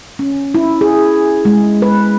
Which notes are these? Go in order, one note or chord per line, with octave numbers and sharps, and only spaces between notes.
C#4
E4
G#4
G#3
B4